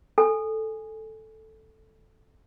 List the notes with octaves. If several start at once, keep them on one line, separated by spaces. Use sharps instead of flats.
A4 G#5